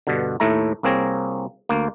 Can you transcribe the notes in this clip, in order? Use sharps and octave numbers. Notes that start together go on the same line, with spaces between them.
G2 B2 D3
D#2 A2 A3 E4 A#5
C2 A#3 C4 G#4 C#5 A#5
D2 A#3